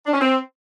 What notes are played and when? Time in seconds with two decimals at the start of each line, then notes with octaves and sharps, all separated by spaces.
0.06 D4
0.13 C#4
0.21 C4